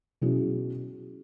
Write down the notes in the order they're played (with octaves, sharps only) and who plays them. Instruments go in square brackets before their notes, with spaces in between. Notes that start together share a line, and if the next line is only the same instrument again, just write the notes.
[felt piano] B2 F#3 C#4 E4 G#4